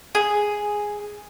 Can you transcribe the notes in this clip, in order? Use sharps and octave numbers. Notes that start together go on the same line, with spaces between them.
G#4